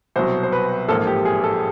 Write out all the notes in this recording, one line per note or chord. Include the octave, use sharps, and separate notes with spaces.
C2 B2 F#3 C5
C5
B4
A1 G#2 F3 A#3 A4
G4
G#4
A4